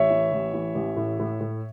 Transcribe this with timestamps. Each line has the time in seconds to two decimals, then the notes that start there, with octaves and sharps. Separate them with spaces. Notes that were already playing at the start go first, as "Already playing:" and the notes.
Already playing: A1 C#5 E5
0.10 E3
0.32 A1
0.54 E3
0.75 A1
0.97 A2
1.20 A2
1.41 A2